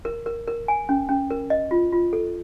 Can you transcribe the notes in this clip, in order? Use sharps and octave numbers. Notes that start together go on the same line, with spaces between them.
A#4
A#4
A#4
G#5
C#4
C#4
A#4
D#5
F4
F4
A4